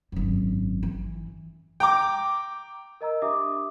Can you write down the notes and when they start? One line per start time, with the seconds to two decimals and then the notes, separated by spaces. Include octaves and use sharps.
0.12 G#1 F#2
0.83 E3
1.80 G5 A#5 D6
3.01 A#4 D#5 A#5 E6
3.22 D4 G4 E5 D6 D#6